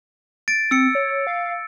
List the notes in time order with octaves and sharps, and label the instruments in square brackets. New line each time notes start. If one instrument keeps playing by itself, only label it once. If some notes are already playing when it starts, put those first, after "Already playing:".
[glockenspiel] A6 D7
[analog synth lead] C4 [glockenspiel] E6 C#7
[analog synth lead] C#5
F5